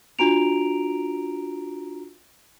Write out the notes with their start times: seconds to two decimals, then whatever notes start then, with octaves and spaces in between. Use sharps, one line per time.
0.19 D4 F4 F#4 A#5 D7 F7